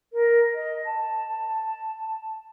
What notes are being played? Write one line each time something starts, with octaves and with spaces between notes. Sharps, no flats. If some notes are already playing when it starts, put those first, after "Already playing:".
A#4
D#5
A5
A5